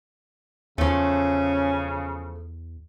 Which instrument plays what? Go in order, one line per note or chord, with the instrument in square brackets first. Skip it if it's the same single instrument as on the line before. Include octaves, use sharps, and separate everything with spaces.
[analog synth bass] E2 [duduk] C#3 [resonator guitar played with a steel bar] F3 A3 [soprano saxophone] C#4